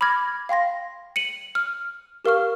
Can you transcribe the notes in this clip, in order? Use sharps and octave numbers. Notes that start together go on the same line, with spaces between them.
B5 D6 F6 G#6 A#6
F5 G5 C6 A#6
C#7 D#7 F#7
F6
G4 A#4 F5 C#6 F6